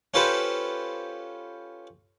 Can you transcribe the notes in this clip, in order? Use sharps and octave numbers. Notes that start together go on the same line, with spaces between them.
C#4 F4 G4 A4 B4 C5